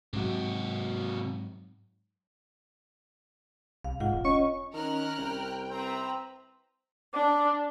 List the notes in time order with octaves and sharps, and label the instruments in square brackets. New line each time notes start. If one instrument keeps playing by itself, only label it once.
[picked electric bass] G#2 F#3 [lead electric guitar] C3 F#4
[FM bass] C2 [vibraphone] F5
[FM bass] G#2 [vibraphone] F4 F#5
[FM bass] E1
[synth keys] C#4 C#6 [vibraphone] D#5
[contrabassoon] D#3 [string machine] C#4 [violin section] A#4 F6 F#6
[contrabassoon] C2 [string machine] G5
[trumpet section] C4 [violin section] B4 E5 A#5
[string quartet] D4 [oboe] D6